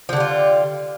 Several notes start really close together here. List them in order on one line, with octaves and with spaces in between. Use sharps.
F3 D3 G3 F4